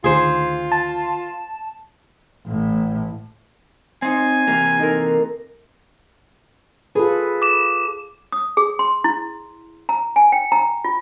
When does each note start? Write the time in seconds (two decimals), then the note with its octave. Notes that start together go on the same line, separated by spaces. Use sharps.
0.04 D2 D#3 F4 G#4 C5
0.72 A5
2.47 A1 A2
4.02 C4 D#4 G#5
4.47 C3 E3 A#3 G4
4.79 D#4 A4 A#4
6.95 F4 G#4 A4 B4
7.42 D6 E7
8.32 D#6
8.57 G#4
8.79 C6
9.04 E4
9.89 A#5
10.16 G#5
10.32 G5
10.52 A#5
10.84 F4